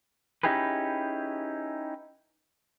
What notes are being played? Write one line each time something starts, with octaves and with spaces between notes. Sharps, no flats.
C#4 D#4 E4 G4 G#4 B4